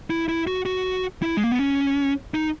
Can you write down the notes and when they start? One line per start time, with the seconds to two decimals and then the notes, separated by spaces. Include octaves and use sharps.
0.10 E4
0.28 E4
0.47 F#4
0.66 F#4
1.22 E4
1.37 G#3
1.44 A#3
1.52 B3
1.59 C#4
2.34 D#4